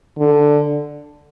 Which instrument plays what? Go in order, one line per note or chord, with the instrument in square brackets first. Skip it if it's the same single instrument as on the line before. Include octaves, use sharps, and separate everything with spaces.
[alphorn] D3